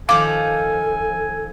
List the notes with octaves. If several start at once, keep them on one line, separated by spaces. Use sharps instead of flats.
D#3 F3 A4 F5 G#5 D6